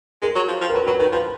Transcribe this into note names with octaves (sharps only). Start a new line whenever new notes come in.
G#3 A#4
F#3
F3
F3
A#4
F#3 B4
F#3 B4
D#3 B4
F3 B4